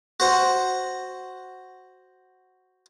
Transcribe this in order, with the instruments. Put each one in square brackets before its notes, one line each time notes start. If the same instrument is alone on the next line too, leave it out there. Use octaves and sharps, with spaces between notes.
[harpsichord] F#4 C5 F#5